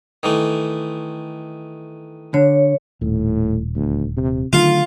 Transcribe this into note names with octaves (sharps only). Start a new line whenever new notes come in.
D#3 E3 A3
D3 C#5
D#1 A2
D2
C3
D3 D#3 F#3 A3 F4